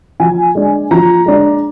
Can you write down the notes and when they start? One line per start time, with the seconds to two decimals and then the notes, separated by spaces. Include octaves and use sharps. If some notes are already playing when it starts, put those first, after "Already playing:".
0.20 F3 G#5
0.55 G#3 D4
0.91 F3 A#5
1.26 G#3 D4